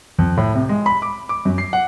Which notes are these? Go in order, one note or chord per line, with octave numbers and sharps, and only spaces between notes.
F2
A2
C3
G#3
B5
D6
D6
F#2
C7
F#5